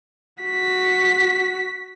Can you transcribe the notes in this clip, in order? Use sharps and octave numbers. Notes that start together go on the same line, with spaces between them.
F#4 B6